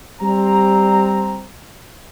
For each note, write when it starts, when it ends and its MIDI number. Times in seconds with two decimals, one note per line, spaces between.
0.22 1.46 55
0.22 1.46 60
0.22 1.46 82